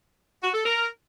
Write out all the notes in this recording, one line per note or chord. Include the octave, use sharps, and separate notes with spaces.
F#4
A4
A#4